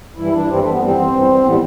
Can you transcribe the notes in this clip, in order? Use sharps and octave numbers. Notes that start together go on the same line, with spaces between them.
G2 E3 G3 E4
D4
G2 E3 G3 C4
A3
B3
G2 E3 G3 C4
G2 E3 G3
A2 E3 G3 B3